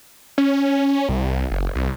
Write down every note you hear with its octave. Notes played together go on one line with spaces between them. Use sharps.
C#4
C2
F#1
C2